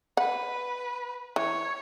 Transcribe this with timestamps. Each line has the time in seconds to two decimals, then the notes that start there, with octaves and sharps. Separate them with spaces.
0.17 B4 F#5
1.36 E3 C#5